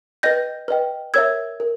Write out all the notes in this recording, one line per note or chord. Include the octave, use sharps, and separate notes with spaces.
B4 D#5 G5 G6 A#6
B4 D#5 G5
A#4 C#5 E5 E6 G#6
A#4